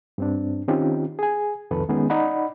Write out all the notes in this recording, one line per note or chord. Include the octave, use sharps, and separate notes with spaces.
G2 C4 D4
D#3 C4 C#4 D#4 F4 G4
G#4 G#5
C2 F2 D#3 A4 B4
D#3 G#3 B3 C#4 D#4 G#4
D#4 D5 D#5 F#5 B5